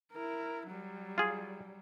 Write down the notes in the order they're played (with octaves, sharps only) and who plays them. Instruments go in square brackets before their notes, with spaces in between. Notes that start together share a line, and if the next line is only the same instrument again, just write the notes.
[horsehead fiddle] E4 A#4
F#3 G3
[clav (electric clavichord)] F4 G#4